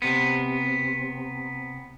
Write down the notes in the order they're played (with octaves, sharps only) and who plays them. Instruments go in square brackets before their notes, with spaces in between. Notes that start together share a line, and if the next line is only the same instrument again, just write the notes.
[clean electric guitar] C3 B3